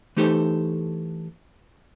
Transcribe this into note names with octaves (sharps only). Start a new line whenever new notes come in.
E3 A3 D#4 G4 A4 C5